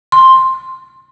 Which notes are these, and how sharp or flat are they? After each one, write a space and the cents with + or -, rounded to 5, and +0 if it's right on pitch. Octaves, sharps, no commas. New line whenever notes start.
C6 +5